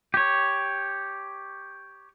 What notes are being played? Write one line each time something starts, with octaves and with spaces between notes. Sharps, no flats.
G4 C#5